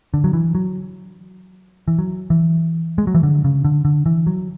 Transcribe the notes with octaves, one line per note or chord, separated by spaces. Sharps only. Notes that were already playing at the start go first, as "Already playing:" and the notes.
D3
F#3
E3
F#3
E3
F#3
E3
G#3
F#3
E3
D3
C#3
D3
D3
E3
F#3